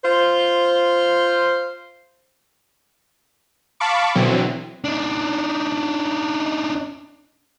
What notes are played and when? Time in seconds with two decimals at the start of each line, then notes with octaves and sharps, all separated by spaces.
0.04 F4 C5
3.80 F5 A5 B5 C#6 D6
4.15 B2 D3 E3 F#3 C4
4.84 D4 D#4